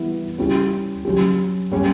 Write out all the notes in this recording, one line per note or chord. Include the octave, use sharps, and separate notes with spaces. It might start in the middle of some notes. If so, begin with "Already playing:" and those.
Already playing: E3 G3 B3 E4
G3 C#4 E4 G4
F#3 C#4 G4
G3 C#4 G4